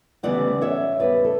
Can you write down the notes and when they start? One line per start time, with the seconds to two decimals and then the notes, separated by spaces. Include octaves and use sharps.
0.23 D2 C#3 E3 G3 B3 D5 F#5
0.61 C#5 E5
0.99 E2 C#3 G3 B3 B4 D5
1.25 A4